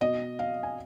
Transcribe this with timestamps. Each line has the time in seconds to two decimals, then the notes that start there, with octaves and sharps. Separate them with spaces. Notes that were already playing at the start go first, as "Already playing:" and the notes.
0.01 B2 D#5
0.39 F5
0.63 G#5